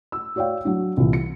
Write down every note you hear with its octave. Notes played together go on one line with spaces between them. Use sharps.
E6
F#4 C#5 D5 F5 G5
F#3 D4
C2 A#2 E3
C#7